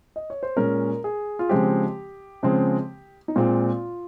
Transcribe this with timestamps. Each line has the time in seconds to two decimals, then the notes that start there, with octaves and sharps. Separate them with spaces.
0.16 D#5
0.30 C#5
0.43 C5
0.57 A#2 G#3 C#4 A#4
1.04 G#4
1.39 F4
1.49 C#3 F3 G#3 C4 G4
2.43 C#3 F3 G#3 C4
3.28 D#4
3.36 A#2 G#3 C4 F4